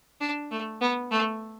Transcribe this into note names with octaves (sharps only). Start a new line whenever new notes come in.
D4
A3
B3
A3